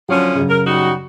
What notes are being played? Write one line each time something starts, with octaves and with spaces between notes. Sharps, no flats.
D3 F3 F#3 C#4
F#2 C#3
A#4
G3 D#4 F#4